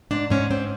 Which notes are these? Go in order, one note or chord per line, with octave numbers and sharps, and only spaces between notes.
G#2 D4
G#2 C#4
G#2 C4